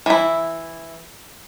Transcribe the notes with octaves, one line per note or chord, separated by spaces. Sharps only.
E3 E4